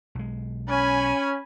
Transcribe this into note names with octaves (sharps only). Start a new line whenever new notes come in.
B1 G#3
C#4 G#5 B5